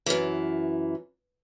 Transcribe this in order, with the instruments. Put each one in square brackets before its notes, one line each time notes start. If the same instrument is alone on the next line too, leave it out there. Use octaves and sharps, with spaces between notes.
[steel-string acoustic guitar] F#2 E3